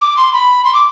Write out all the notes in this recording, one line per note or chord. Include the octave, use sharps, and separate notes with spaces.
D6
C6
B5
C6
D6